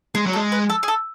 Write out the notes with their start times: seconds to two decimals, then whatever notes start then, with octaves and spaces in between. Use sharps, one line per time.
0.15 G#3 G#4
0.26 F#3
0.33 A4
0.36 G#3
0.52 B4
0.70 A4
0.83 G#4
0.88 A4